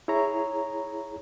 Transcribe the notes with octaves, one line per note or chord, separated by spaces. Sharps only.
E4 G#4 C#5 A#5